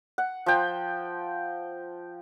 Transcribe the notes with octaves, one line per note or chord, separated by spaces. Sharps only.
F#5
F3 G5